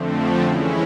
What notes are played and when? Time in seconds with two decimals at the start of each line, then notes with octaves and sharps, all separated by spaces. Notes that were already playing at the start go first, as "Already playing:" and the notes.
Already playing: F2 D3 F3 A3 C4
0.41 E3 G#3 C#4 E4